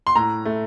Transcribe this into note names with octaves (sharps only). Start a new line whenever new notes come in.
C6
A2 A#5
A3